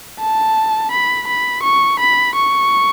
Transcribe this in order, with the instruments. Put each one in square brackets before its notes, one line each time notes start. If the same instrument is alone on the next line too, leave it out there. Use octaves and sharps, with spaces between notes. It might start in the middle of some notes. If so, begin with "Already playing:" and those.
[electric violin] A5
B5
B5
C#6
B5
C#6